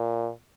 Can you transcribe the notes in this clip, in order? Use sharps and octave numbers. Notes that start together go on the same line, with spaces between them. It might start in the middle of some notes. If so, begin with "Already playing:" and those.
Already playing: A#2